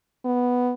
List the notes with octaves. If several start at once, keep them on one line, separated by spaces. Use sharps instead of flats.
B3